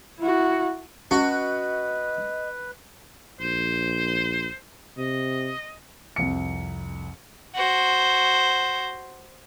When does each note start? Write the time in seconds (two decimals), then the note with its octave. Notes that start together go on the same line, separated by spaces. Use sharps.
0.19 E4 F#4
1.11 C#4 F#4 B4 D#5
3.40 A#1 C5
4.98 C3 D#5
6.16 C2 F2 C#7
7.55 F#4 C5